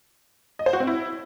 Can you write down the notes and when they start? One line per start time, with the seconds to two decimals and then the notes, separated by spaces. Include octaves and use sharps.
0.59 D#5
0.66 C5
0.73 F#4
0.80 C4
0.87 E4